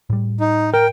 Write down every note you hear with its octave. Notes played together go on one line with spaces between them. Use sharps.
A2 G3
D#4
A#4 G5